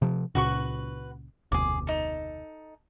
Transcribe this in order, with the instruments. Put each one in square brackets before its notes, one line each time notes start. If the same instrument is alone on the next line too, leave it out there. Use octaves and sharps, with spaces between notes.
[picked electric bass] C3 F3
[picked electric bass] C#2 A#2 C#3 [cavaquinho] F#4 B4 C#6
[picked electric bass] F1 D2 B2 [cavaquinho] G#4 D6
[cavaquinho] D#4 A4